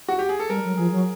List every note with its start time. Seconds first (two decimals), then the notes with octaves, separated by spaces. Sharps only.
0.09 F#4
0.19 G4
0.29 G#4
0.39 A4
0.50 G3 A#4
0.64 F#3
0.77 F3 G#4
0.91 F#3